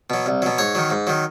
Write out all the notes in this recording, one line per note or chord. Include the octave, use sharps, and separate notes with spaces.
B2 F#3
C2
B2 F#3
G#2 C#5
D#3 F#3
G#2
D#3 F#3